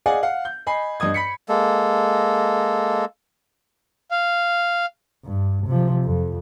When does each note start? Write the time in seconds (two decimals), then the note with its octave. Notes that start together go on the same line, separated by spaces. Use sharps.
0.06 G#4 D5 D#5 F5 F#5 G#5
0.23 F5 F#5
0.45 G6
0.67 D#5 G#5 B5 C7
1.00 G2 D#5 D#6 G#6
1.14 B5 B6 C#7
1.49 G#3 A#3 A4
4.11 F5
5.25 G2
5.67 C3 F3
6.04 F2